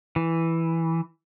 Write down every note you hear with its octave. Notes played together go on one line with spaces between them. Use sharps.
E3